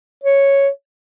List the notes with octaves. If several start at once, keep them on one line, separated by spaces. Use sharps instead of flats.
C#5